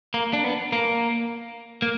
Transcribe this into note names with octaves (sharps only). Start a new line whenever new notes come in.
A#3
D4
B3
A#3
A#3